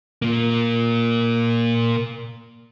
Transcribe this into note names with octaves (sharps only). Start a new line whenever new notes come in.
A#2 A#3